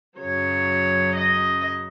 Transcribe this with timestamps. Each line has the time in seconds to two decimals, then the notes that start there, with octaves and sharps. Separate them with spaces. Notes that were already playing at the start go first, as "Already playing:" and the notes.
0.19 F#2 C#3 F#3 C#5
1.15 D#5